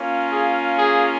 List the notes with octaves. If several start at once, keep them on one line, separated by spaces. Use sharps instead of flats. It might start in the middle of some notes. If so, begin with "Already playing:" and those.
Already playing: A#3 C#4 F4
G#4
G#4